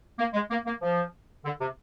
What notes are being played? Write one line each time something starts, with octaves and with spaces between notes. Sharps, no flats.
A#3
G#3
A#3
A#3
F3
D3
C3